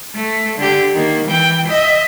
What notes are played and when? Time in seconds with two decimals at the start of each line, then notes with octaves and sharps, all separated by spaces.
0.15 A3
0.58 D3 G4
0.93 D#3 A#3
1.27 E3 G5
1.68 D#5 E5